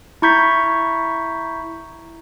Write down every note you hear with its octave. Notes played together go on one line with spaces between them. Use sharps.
E4 A#5 C#6 G6 G#6 B6